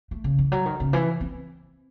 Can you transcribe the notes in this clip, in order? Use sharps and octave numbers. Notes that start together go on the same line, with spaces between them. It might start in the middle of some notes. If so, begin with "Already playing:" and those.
A3
C#3
E3
F#3
D#3
C#3
E3
C4